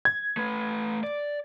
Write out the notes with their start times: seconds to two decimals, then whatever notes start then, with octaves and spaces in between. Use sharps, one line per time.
0.05 G#6
0.37 A3 B4
1.03 D5